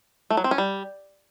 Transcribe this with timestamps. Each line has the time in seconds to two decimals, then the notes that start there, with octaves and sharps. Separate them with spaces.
0.30 A3
0.37 F#3
0.44 C4
0.51 C#4
0.58 G3